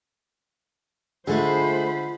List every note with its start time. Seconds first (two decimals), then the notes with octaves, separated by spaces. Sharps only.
1.27 D3 G#3 A3 F4 G#4 C5 B5